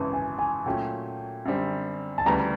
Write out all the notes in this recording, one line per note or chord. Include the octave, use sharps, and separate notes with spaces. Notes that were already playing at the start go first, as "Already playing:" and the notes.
Already playing: G#1 F#2 C#3 E3 A5
G#5
G#5
A#2 F#3 A3 C#4 G5
F#2 D3 G3 C4
A5
D2 C#3 E3 G3 A#5